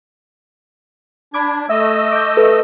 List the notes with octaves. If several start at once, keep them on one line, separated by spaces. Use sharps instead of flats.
D4 B5 D6 G#6
A3 D#5 E5 E6
D6 D#6 G6
A4 B4